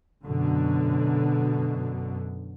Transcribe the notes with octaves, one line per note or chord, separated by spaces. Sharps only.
F#2 B2 D3